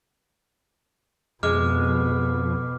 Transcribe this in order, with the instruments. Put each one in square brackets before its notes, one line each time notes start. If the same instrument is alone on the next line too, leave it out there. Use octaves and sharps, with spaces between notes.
[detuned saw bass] F2 [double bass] B2 [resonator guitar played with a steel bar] G#3 [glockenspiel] D6 F6